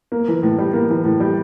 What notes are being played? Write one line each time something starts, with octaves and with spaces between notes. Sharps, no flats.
A#3
E3
A2
G3
A#3
E3
A2
G3